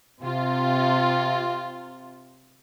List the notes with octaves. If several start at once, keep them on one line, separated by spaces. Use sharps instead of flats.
C3 F4